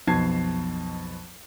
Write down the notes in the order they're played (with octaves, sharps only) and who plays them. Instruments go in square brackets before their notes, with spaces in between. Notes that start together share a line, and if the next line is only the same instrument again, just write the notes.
[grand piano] B1 F2 B2 A5 G#6 C7